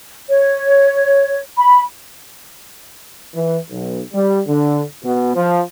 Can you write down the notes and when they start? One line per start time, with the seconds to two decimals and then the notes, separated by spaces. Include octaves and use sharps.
0.28 C#5
1.56 B5
3.35 E3
3.71 B1
4.14 G3
4.48 D3
5.04 B2
5.35 F3